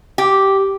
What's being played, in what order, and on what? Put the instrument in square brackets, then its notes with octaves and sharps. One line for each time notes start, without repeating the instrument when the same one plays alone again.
[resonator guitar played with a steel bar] G4